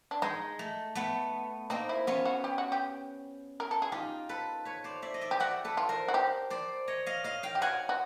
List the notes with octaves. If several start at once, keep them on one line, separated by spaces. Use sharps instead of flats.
D4
G#3 D#4
A3
A3 B3
A#3 C4 D#4
E4
B3 C#4 F4
F#4
G4
F#4
G4
A#4
A4
G#4
D#4 F4 G4
A4 B4
B4 C#5
C5 D5
D5 E5
D#5
D5 E5
G4
F#4 D5 E5
A4 B4
F4
A#4 C5
F#4
G4
C5 D5
C#5 D#5
D#5 F5
D#5 F5
F5 G5
G4
F#4 F#5 G#5
F#4